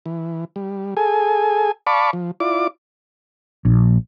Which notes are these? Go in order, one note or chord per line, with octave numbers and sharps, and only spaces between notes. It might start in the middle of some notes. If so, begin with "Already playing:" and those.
E3
G3
G#4 A4 G#5
D5 F5 A5 B5 C#6 D6
F3
E4 F4 D5 D6
A#1